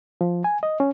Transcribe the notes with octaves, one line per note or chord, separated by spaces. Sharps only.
F3
G#5
D#5
C#4